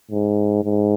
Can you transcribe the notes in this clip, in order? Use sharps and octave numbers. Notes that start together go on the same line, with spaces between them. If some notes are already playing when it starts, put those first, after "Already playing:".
G#2
G#2